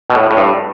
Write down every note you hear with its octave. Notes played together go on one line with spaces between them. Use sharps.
B2
A2
A2
G2